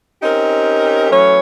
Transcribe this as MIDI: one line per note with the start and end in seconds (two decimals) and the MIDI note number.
0.22 1.10 60
0.22 1.10 61
0.22 1.10 63
0.22 1.10 67
0.22 1.10 70
1.10 1.40 52
1.10 1.40 54
1.10 1.40 57
1.10 1.40 61
1.10 1.40 73